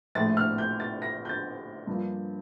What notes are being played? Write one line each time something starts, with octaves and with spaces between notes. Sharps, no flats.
A#1 A2 A3 A6
F6
G6
A6
A#6
G6
A6
G2 F3 A#3